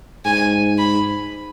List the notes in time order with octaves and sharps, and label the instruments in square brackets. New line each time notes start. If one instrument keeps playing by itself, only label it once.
[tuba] G#2 [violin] G#5
[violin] B5